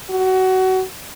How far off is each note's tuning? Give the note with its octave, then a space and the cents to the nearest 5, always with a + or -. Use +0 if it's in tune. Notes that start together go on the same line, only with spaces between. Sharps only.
F#4 +20